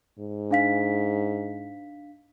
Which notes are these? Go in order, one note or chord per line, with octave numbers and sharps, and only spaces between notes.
G#2
D4 F5 B6